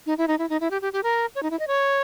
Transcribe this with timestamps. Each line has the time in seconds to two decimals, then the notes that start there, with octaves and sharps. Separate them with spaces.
0.06 D#4
0.18 E4
0.28 D#4
0.39 E4
0.50 D#4
0.61 E4
0.71 G4
0.82 G4
0.93 G4
1.03 A#4
1.35 C#5
1.43 D#4
1.51 E4
1.59 D#5
1.67 C#5